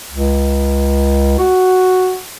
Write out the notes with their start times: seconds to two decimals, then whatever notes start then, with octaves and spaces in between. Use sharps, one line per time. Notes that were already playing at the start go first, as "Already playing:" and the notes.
0.12 C#2
1.38 F#4